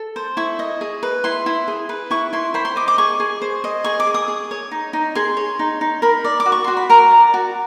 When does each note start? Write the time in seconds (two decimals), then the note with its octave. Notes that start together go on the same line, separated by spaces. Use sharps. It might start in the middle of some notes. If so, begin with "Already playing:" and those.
Already playing: A4
0.16 C5
0.37 E4 C#6
0.59 D#5
0.81 G#4
1.03 B4
1.24 E4 C6
1.46 E4
1.68 G#4
1.89 B4
2.11 E4 C#6
2.33 E4 C6
2.54 C5 B5
2.65 C6
2.76 D#5 D6
2.88 D6
2.98 G#4 C#6
3.20 G#4
3.42 C5
3.64 D#5
3.84 G#4 C#6
4.00 D6
4.07 G#4
4.14 D#6
4.28 G#4
4.51 C#5
4.71 D#4
4.93 D#4
5.15 G#4 C6
5.37 C#5
5.59 D#4
5.81 D#4
6.02 A#4 B5
6.24 D5
6.40 D6
6.46 F#4
6.52 C#6
6.64 F#4 C6
6.77 B5
6.90 A#4 A#5
7.11 D5
7.34 F#4